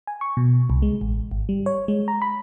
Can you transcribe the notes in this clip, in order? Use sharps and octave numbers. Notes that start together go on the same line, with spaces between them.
G#5
C#6
B2
C2
G#3
A1
G#1
G3
C#5
G#3
A#5
B5